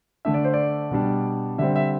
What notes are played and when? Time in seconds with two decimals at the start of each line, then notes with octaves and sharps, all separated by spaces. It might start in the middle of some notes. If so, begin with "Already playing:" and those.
0.25 D3 A3 D4 E5
0.34 D5
0.44 C5
0.54 D5
0.91 B2 G3 D4
1.58 D3 G3 C4 E5
1.76 E5